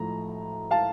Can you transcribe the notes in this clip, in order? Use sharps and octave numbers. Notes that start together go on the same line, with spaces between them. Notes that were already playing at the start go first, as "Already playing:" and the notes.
Already playing: A2 F3 A#5
F5 A5